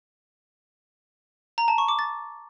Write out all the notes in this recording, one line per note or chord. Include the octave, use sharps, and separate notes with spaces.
A#5
A5
C#6
D6
A6